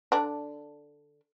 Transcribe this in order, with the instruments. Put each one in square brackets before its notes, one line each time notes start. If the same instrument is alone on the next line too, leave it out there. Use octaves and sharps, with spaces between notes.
[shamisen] D3 D4